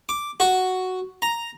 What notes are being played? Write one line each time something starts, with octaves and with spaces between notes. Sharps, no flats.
D6
F#4
A#5